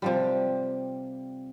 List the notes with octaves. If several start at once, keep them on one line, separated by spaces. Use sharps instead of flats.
C3 F3 G3